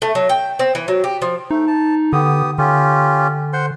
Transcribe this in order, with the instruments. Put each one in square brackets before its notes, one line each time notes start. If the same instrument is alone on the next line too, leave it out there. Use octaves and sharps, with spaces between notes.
[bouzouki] A3
F#3
G5
C4
E3
F#3
G4
F3
[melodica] A3 [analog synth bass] D#4
[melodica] A5
[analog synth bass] D3 [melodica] B3 G4 D#6
[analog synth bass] D3 [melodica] C#4 F4 G4
[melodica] C5 F#5 C6